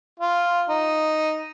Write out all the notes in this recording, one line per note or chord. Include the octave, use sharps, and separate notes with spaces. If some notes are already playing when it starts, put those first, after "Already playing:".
F4
D#4